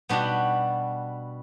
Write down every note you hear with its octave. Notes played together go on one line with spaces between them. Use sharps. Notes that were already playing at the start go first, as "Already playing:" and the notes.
B2 G3 B3 D4 F#4